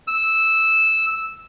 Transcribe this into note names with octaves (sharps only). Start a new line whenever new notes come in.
E6